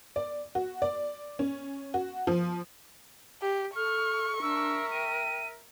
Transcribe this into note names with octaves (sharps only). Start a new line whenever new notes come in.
D5
F#4
D5
C#4
F#4
F3
G4
A4 C#6 F6
D4 A#4 E5 E6
G5 D#7